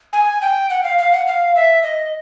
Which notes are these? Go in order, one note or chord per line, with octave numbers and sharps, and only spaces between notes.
G#5
G5
F#5
F5
F5
F#5
F5
E5
D#5